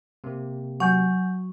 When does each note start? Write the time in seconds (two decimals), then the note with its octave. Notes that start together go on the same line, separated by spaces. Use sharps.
0.24 C3 A#3
0.80 F#3 F#5 G#5 C#6 G6